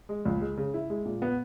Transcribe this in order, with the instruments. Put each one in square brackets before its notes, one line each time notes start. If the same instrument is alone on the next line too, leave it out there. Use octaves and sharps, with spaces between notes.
[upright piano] G#3
C#2
G#3
C#3
E4
G#3
A#2
B3